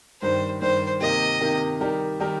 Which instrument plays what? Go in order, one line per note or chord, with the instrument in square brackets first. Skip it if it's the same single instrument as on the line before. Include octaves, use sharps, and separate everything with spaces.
[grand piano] G2 D#3 G3 [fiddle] C5
[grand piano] G2 D#3 G3 [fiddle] C5
[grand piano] C3 D#3 A#3 G4 [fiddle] D#5
[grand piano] C3 D#3 A#3 G4
D#3 G3 D#4 G4 A#4
D#3 G3 D#4 G4 A#4